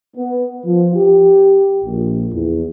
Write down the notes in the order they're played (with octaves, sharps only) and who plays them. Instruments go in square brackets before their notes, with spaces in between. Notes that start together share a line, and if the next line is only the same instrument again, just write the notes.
[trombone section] B3
F3
G4
A#1
E2